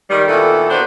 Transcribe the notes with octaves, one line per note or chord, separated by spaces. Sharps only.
D#3 G3
A#2 D#3 E3 B3 E4 A4
A#3 B3 D4 F#4 C5